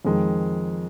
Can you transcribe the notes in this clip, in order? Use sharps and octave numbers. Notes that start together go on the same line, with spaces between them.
F2 D#3 G#3